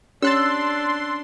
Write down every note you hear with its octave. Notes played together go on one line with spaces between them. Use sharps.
C#4 D4 G4 C#5 C6 E6 F#6 A6